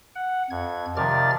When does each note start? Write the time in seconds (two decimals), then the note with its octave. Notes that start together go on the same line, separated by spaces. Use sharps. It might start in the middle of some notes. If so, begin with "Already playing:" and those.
0.16 F#5
0.50 F2 G#6
0.97 C3 D#3 F3 D5 F6 A6